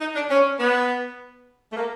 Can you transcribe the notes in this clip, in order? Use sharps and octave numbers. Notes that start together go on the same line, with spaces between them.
D#4
D4
C#4
B3
A3
A#3